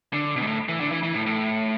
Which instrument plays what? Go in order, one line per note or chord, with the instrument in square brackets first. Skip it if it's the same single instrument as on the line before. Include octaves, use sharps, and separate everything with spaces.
[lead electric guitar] D3
B2
G#2
A2
E3
D3
E3
E3
A2
A2